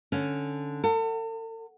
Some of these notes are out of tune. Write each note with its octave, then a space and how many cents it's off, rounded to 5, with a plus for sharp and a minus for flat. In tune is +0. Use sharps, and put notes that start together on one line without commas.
D3 +0 C#4 +0
A4 +40 F#5 +0